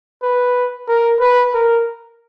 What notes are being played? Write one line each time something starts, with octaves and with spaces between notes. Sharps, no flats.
B4
A#4
B4
A#4